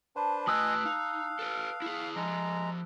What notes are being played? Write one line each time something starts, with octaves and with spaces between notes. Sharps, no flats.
D4 B4 C5 A5
A2 B4 D#5 G#5 C6 D#6 E6 F#6
D#4 F5
A4 B4
E4 G#4
F3 G#3 D#4 A#5